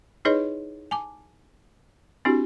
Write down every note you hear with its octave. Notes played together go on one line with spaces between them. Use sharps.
D#4 E4 G#4 B4 C#5 D#5
G#5 A5 D6
C4 D4 E4 F#4 G4